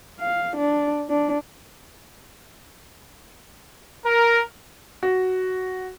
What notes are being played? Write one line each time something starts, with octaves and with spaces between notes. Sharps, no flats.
F5
D4
D4
A#4
F#4